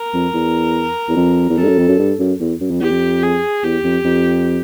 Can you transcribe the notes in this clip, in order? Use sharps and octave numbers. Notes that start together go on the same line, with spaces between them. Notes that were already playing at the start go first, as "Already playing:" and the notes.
Already playing: A#4
F2
E2
E2
F2
E2
F2 A4
G2
F#2
F2
F#2
G2
F#2
E2
F#2
F2
E2 G4
F2
G#4
E2 G4
F2
F2